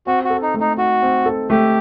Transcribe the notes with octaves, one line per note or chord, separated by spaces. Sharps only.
C4 F#4
F#4
A4
D#4
A3
D#4
D#4 F#4
C4
A4
A3 G4